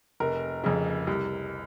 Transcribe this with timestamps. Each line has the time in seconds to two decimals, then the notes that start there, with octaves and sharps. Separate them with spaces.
0.20 F1 A#4
0.64 F2 C#3
1.07 C2